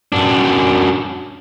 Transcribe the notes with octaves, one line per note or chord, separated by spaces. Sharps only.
F#2 D4